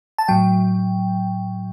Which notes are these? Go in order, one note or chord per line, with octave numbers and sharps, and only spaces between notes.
A5
A2 F#3 G5